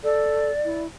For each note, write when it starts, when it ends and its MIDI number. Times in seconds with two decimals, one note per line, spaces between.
0.03 0.50 69
0.03 0.79 74
0.65 0.86 64